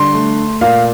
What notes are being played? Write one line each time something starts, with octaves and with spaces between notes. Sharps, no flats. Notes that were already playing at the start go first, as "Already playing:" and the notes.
Already playing: D3 G3 C6
A3
A#2 F5